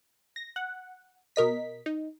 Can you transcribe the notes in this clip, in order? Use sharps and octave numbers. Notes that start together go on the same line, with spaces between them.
A#6
F#5
B2 A#4 D#5 B6
D#4